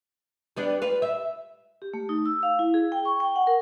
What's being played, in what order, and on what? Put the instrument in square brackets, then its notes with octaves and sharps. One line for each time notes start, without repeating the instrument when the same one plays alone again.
[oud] G3 B3 D4
F4 B4
E5
[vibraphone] G4
A3
D#4
E6
F5
E4
G#4
G5
C#6
G5
F#5
A#4